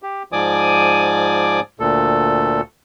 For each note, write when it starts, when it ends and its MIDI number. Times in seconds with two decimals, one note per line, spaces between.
0.03 0.23 67
0.32 1.60 44
0.32 1.60 53
0.32 1.60 74
0.32 1.60 80
0.32 1.60 86
0.32 1.60 87
1.80 2.61 38
1.80 2.61 46
1.80 2.61 69